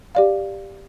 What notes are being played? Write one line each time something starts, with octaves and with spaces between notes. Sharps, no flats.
G4 D5 F5